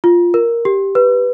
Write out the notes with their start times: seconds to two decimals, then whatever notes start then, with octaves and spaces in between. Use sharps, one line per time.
0.04 F4
0.34 A#4
0.65 G4
0.95 B4